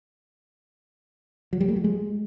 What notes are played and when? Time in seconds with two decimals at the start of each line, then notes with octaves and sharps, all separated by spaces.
1.53 F#3
1.61 G3
1.68 A3
1.76 F#3
1.84 G#3